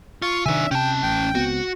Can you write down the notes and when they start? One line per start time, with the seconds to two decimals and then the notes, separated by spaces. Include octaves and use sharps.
0.22 F4 C#6
0.46 C3 D#3 D4 E5 G#5
0.71 C3 C#4 G5 A5
1.03 A1 G5
1.35 C#2 B3 C4 F#4